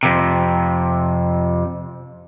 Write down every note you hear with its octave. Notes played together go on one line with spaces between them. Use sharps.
F2 C3